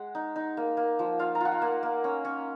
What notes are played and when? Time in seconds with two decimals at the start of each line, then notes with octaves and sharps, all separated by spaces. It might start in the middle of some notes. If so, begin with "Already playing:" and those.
Already playing: G#3 F#5
0.15 D#4
0.36 D#4
0.57 A#3
0.77 A#3
0.99 F3
1.19 F4 F5
1.35 A#5
1.41 F4 F#5
1.52 G#5
1.62 A#3
1.83 A#3
2.04 C#4
2.25 C#4